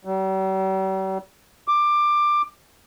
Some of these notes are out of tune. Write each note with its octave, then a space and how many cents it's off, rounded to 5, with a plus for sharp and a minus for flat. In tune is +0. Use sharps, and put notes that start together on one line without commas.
G3 -45
D6 +15